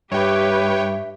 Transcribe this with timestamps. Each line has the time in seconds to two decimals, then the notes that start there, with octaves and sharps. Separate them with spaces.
0.12 G2 G4 B4 C#5 E5 G5